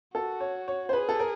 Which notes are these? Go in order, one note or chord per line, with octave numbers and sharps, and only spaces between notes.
F#4 A4
C#5
C#5
C5
G#4 B4
A4
A#4